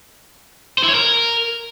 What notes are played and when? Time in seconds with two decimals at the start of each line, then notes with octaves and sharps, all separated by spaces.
0.78 C5
0.84 E4
0.89 C#5
0.94 A#4